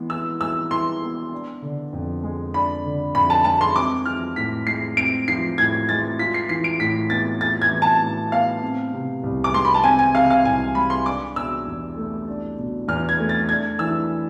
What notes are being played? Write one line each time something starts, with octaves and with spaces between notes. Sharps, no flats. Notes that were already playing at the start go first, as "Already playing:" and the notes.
Already playing: E3 G#3 B3
E4 E6
G#3 E6
E3 C6
B3
D4
D3
F2
G#3
D4 B5
D3
F2 B5
A5
G#3 A5
C6
C4 D6
F3 F6
A2 B6
G#3 C7
C4 D7
F3 C7
A2 G#6
G#3 A6
F4 B6
C7
E3 C7
D7
A2 B6
B3 A6
F4 A6
G#6
E3
A5
A2
B3 F5
C4
C3
C2
D6
G#3 C6
B5
A5
C4 G#5
G#5
C3 F5
F5
C2 G#5
G#3 B5
C6
D4 D6
B2 E6
E2
A3
D4
B2
E2 F6
G#6
A3
A6
D4 G#6
E3 E6